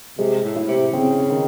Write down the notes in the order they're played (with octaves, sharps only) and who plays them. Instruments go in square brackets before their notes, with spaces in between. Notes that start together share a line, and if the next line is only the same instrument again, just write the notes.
[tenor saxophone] C3 [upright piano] G#3
[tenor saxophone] A2
[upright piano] E4
[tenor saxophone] C3
[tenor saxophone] C#3 [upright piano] C4
[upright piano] D#3